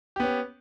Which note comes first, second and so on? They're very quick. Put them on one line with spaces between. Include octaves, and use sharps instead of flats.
G4 B3 C#4